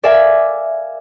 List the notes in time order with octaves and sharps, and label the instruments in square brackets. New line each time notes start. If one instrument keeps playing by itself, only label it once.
[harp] A#4 D5 E5 F5 G#5